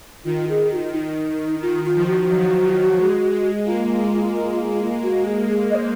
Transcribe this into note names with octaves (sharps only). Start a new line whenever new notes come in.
D#3 F4
G#4
F#4
F4
D#3 D#4
D#3 F4
F4
F3
F#4
F#3
F3
G#3
G#3
A#3 F4
G#3
F#4
G#4
G#4
D#5
C5